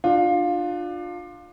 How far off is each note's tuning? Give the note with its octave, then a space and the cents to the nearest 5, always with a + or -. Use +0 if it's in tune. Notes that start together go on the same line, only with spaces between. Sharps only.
D4 +25 F4 +15